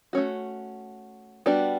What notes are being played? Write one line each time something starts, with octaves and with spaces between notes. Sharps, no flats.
A3 C#4 F#4
G3 B3 D4 F#4